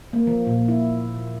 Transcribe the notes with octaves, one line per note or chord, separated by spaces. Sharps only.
A#3
F3
A#2
E4